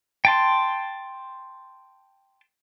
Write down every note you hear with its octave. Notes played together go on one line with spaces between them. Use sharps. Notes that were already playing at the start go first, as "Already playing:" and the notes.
G5 A5 C6